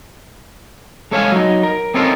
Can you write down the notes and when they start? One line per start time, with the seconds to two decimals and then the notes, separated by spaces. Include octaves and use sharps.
1.11 G#3 A4 C#5 E5 F5 G#5
1.32 F#3 D#4
1.63 A#4
1.94 C4 C#4 D#4 F4 A4 A#4